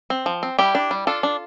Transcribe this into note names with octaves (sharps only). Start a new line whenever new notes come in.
C4
F3
C4
G3 E4 G4
D4
G3
D4 F4 A4
D4